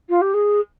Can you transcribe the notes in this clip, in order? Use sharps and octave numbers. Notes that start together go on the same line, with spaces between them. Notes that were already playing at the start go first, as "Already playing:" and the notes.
F4
G4
G#4